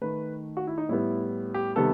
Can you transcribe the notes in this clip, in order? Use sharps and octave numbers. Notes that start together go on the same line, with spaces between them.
D#3 A3 B4
F#4
E4
D#4
A2 G3 B3 E4
G4
C3 D#3 G3 B3 A4